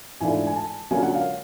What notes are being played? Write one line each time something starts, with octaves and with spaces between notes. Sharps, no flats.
G#2 E3 A3 D4 F4 G#5
G#5
A5
D3 F#3 A#3 C#4 F4 G#5
F#5
F5